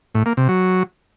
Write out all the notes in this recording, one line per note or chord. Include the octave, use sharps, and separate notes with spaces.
A2
A#3
C3
F#3